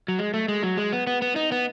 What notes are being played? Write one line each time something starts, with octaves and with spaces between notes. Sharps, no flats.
F#3
G#3
A3
G#3
F#3
G#3
B3
B3
B3
D#4
B3